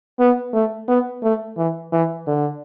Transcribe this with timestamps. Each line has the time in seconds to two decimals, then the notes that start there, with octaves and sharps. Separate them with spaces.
0.20 B3
0.54 A3
0.88 B3
1.23 A3
1.57 E3
1.92 E3
2.27 D3